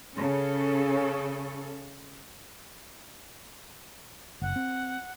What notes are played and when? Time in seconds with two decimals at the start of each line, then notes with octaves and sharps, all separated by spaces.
0.17 C#3 C#4 A4
4.42 F#1 F#5
4.56 C4